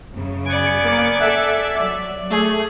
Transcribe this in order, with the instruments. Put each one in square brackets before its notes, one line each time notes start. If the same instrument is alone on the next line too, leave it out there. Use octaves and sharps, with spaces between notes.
[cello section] F#2 C#3
[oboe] B3 [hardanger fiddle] D5 G#5 [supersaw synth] C#7 D7
[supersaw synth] A#3 D6 C#7
[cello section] A4 [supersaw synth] E5 [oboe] F#5
[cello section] F#3 [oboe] D5
[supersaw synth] A3 [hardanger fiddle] G#4